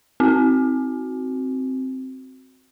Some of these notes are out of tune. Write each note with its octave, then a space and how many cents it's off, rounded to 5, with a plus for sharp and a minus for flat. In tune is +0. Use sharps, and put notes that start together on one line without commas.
C4 +0 F#4 +0